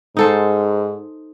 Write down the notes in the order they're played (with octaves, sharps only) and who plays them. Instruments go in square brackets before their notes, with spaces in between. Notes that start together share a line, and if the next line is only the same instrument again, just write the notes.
[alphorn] G#2 [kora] D#4 A4 C5